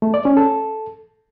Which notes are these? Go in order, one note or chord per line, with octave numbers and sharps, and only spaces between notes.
A3
D5
C#4
A4